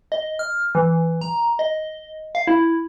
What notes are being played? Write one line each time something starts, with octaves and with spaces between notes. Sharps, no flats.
D#5
F6
E3
A#5
D#5
F5
E4